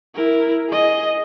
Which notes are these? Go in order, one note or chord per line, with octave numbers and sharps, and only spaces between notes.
E4 A#4
G#4 D#5